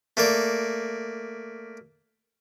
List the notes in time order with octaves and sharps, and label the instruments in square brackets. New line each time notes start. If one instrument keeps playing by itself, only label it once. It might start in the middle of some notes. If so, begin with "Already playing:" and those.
[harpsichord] A3 A#3 D5